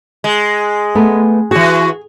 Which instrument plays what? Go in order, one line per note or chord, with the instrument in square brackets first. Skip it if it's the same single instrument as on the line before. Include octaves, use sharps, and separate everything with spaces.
[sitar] G#3
[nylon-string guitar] A3 B3
[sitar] E3 F#4 [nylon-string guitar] G#4